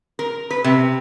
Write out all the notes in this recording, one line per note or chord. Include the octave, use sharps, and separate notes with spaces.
A#4
B4
C3